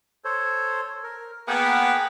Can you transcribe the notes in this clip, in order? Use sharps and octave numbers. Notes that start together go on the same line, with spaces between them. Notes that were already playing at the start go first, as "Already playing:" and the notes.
A4 C5 C#5
A#4
A#3 B3 G#4 F#5 G5